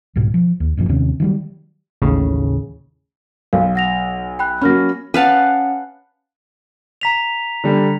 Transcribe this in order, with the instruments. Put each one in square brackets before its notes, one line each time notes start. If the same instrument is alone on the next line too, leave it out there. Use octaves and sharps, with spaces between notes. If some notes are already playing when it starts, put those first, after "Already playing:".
[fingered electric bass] C2 G#2 B2
F3
D#2
A1 F#2 A#2 F3
D#2 C3 D#3 C#4
D#3 F#3 G3
[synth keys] A1 D#2 A2 C#3
[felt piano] B1 [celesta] F5
[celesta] F#5 A#6 F7
G5 B5 F#6
[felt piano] F#3 A#3 C#4 [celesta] B5 F6 A#6
[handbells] C#4 F#5 [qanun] B4 F5 A5
[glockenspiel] A#5 B6 F7
[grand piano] D3 G3